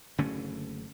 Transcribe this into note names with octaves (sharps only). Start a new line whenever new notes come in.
F#1 D3 A3 C#4